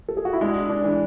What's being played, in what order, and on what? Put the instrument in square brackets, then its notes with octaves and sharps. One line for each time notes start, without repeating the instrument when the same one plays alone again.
[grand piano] A4
G#4
F#4
E4
[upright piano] G#3 [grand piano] D4
[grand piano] D4
[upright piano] E3